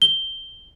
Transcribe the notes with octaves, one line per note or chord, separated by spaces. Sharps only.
G7